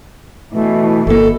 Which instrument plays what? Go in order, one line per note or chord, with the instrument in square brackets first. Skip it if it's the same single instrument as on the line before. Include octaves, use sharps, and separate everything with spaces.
[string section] B2 E3 [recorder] A3
[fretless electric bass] G1 A#3 [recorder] A4